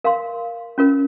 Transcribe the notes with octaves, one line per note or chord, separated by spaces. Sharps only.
A#4 F5 C6
C#4 F4 A#4